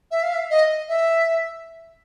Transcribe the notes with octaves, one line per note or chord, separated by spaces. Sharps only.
E5
F5
E5
D#5
E5